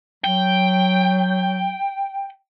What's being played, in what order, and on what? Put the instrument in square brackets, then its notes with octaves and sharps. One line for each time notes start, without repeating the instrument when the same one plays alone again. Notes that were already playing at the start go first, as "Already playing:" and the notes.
[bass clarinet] F#3 [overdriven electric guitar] G5